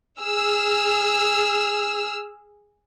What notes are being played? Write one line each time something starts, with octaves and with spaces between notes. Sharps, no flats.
G#4 E6 F6